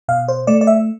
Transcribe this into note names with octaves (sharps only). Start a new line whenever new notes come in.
B2 F5
C5
A3 D5
D5
E5